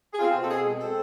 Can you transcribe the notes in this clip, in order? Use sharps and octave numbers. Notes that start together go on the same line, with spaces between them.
G#4
C4 F4
B2
A4
B2 G#4
G#3
C4 A4